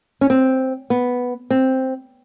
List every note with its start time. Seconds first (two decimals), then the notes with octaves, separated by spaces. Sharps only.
0.21 C#4
0.30 C4
0.90 B3
1.51 C4